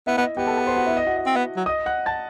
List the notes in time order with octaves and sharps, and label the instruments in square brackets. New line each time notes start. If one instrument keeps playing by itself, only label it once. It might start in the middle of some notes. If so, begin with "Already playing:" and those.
[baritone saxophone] B3 [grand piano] E4 E5
[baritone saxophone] B3 [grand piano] D#5
[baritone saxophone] B3 [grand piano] G4 G5
[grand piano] A4 A5
A4 A5
C5 C6
F#4 F#5
E4 E5
D#5
F#4 F#5
D#5
[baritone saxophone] C4
B3
F#3
[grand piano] D#5 D#6
F#5 F#6
A5 A6